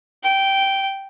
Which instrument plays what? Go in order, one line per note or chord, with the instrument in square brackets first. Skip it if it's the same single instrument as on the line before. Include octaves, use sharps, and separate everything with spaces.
[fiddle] G5